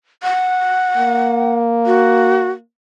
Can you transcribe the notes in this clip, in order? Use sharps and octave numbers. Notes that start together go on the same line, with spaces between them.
F#5
A#3
F#4